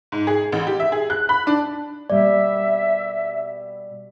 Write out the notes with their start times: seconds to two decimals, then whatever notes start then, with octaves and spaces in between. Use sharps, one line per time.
0.12 G#2
0.27 G#4
0.52 A1
0.67 G4
0.80 E5
0.92 G#4
1.10 F#6
1.29 B5
1.47 D4
2.10 B2 G3 A#3 D5 E5